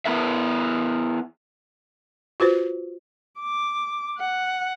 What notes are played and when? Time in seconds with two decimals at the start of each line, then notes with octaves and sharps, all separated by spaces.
0.05 B3 E4 A#4 B4 E5
2.40 F4 F#4 B4 C5
3.40 D6
4.19 F#5